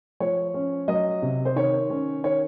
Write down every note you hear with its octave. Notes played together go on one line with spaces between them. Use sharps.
F3 C#5
C#4
F#3 D#5
C3
C5
D#3 C#5
C#4
D#3 C#5